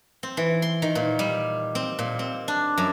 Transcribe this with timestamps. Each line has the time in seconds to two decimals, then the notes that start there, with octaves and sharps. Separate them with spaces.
0.23 C4
0.37 E3
0.62 C6
0.82 D#3
0.95 A#2
1.19 G3
1.75 C4
1.99 A#2
2.19 C4
2.48 D4
2.78 F#2